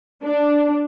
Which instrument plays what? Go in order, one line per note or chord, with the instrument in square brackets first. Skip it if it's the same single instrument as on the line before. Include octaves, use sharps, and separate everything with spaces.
[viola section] D4